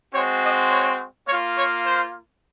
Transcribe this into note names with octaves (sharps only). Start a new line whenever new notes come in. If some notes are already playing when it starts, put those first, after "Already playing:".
G#3 C4 F#4 C#5
D#5
C#5
A#3 F4 C#5
C#5
C5